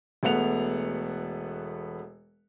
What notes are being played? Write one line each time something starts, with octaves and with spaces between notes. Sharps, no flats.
E1 A3 B3 F#5 F7